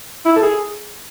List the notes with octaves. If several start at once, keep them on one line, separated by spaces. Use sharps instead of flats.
E4
A4
G#4